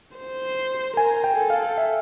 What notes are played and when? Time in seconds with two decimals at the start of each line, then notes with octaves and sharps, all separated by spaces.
0.17 C5
0.97 A#4 G#5
1.24 G5
1.37 A4
1.50 F5
1.78 E5